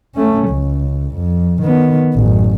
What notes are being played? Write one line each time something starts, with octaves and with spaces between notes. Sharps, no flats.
A3 C#4
C#2
F2
D#3 B3
A1 F#2